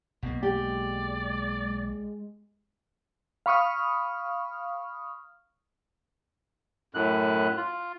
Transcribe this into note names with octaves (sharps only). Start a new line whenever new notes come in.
B1 B2 A#3
G#3 G4 D5
F5 B5 C#6 D#6 F6
F#2 A2 F#6
F4